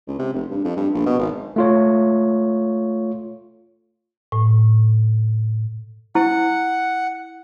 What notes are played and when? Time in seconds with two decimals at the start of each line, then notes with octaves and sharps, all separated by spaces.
0.08 C#2
0.19 C3
0.34 F1
0.51 G2
0.65 F2
0.77 G2
0.95 A#1
1.06 B2
1.19 G#1
1.56 A3 F4 C#5
4.32 A2
6.15 E4 F#5